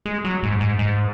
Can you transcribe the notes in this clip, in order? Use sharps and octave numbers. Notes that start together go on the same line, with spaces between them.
G#3
F#3
G#2
G#2
G#2